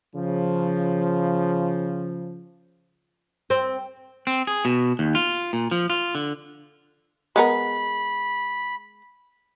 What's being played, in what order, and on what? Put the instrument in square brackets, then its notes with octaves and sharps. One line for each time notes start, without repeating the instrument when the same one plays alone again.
[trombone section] C#3 F3
[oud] C4
[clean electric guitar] C4
G#4
B2
D#2
F4
A#2
F3
F4
D3
[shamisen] G#3 B3 A#4 [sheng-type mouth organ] B5